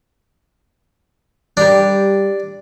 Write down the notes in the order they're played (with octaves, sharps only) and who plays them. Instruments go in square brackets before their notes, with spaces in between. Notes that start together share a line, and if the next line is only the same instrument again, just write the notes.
[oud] G3 G4 A#4 [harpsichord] D4